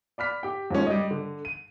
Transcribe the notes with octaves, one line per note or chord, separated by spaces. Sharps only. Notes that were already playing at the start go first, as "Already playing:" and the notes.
D5 B5 F6 B6
G4 G5
D#2 F3 F#3 G#3 A3 C#4
G3 D#5
D3
D#7